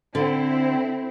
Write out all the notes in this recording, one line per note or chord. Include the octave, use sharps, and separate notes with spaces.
D3 C4 E4